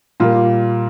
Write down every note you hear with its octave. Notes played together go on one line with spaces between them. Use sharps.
A#2 G3 A#3 F4